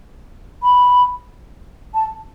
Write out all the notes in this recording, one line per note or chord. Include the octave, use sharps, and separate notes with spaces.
B5
A5